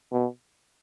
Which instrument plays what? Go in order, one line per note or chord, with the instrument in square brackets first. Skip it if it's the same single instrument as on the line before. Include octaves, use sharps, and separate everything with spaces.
[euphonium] B2